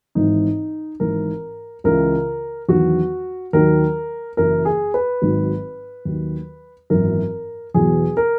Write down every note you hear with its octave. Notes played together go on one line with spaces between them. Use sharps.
G#1 G#2 E3 D#4
G#1 G#2 E3 A#4
C#2 C#3 E3 A#4
E2 D#3 F#3 F#4
D#2 D#3 F#3 A#4
F#1 F#2 E3 A#4
G#4
B4
G#1 G#2 D#3 F#3
D#2 D#3 F#3
G#1 F#2 E3 A#4
E2 B2 F#3 G#4
A#4